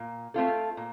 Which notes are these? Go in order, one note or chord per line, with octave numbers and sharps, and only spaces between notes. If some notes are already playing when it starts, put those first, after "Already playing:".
Already playing: A#2
A3 C4 F4 A4
A#2